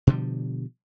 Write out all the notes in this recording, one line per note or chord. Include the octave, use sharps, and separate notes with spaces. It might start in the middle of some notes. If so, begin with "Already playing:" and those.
B2 D3 F3 G3